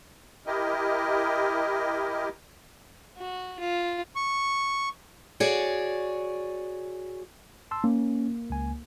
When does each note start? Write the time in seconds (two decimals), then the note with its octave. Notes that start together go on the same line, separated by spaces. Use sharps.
0.46 E4 G4 A#4 D#5
3.18 F#4
3.60 F4
4.15 C#6
5.40 F#4 G#4 C#5 D5
7.71 A5 C6 E6
7.84 A#3 C#4
8.50 C#2 G#5